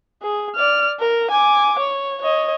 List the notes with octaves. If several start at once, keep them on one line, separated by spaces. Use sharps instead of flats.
G#4
D5 F6
A#4
G#5 D6
C#5
C#5 D#5